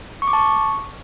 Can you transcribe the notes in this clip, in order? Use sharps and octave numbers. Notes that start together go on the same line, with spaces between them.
C#6
D6
A5
C#6